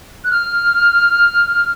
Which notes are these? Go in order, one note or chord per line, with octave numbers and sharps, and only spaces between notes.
F#6
F6